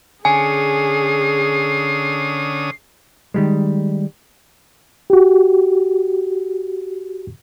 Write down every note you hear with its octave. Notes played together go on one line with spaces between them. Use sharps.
D3 C#4 G#4 G#5 D#6 C7
D#3 G3 G#3
F#4 G4